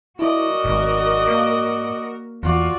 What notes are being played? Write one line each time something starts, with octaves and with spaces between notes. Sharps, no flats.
E4 F#4 A#4 D5 D#5
G#1 G#2
A#3
E2 F4 F#4 D5